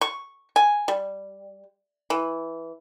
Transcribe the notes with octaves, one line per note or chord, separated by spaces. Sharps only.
C#6
G#5
G3
E3